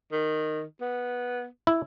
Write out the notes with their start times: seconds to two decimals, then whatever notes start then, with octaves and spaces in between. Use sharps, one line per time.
0.12 D#3
0.81 B3
1.67 E4